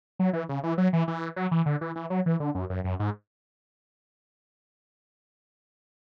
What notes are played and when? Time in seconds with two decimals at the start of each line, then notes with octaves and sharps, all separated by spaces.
0.19 F#3
0.33 E3
0.49 C#3
0.63 E3
0.78 F#3
0.93 E3
1.08 E3
1.36 F#3
1.51 E3
1.66 D3
1.81 E3
1.95 E3
2.10 F#3
2.26 E3
2.40 D3
2.55 F#2
2.70 F#2
2.84 F#2
2.99 G#2